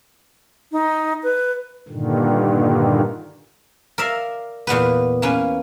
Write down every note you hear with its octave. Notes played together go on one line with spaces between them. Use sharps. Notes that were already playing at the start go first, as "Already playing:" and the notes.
D#4
B4
G2 A#2 D3 D#3
A#4 D5 E5 F5
E2 A#2 B3 B4
A#3 C#4 B4